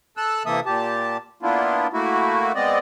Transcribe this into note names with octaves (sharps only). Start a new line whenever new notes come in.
A4 E6 F#6
C3 E3 A#3 A4 E5 D#6
A#2 G4 A5
A#3 B3 D4 E4 F4
A3 A#3 E4 F#4
G#3 B3 C4 D5 D#5